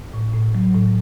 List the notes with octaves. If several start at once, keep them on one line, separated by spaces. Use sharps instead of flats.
A2
A2
F#3
A2